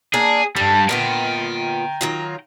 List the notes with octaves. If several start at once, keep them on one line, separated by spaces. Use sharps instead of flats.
A#3 D4 G#4
G2 G3 A4
A#2 B3 F4 G5 A#5
D#3 F#3 F4